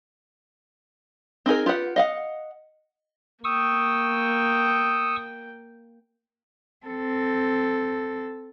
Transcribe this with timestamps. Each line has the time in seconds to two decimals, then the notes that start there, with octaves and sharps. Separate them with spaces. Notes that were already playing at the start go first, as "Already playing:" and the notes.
1.46 C4 D#4 G#4 A#4
1.66 F4 G4 B4 F#5
1.96 D#5 F5 F#5
3.44 A#3 G5 C#6 D#6 E6
6.86 C4 A4